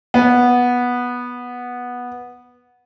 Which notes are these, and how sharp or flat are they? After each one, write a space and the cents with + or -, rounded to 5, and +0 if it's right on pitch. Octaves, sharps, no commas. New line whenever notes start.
B3 -10